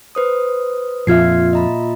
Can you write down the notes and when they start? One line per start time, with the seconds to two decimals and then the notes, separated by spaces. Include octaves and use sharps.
0.15 B4 C5 D#6
1.07 F2 A#2 F4 E5 F6 G#6 C7
1.53 D#5 A#5 B5